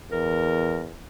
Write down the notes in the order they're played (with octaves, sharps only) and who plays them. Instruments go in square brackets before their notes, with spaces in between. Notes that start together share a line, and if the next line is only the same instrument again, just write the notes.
[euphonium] E2 [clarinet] A#4